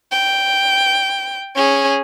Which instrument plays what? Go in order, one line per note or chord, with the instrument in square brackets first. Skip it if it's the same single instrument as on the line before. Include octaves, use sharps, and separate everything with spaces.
[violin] G5
C#4 G#4